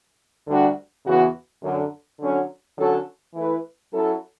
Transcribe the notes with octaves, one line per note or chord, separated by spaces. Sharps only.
D2 D3 G3 D4 F#4
E2 C#3 E3 B3 F#4
F#2 D3 F#3
D3 F#3 C#4
D3 F#3 C#4 F#4 A4
E3 A3 E4 B4
F#3 C#4 E4 A4